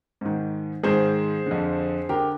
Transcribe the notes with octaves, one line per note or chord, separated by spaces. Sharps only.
G#2 D#3
G#2 D#3 G#4 C5
F2 D3
D3 G4 A#4